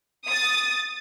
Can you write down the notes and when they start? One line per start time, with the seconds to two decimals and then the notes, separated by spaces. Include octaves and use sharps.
0.27 D#6 A6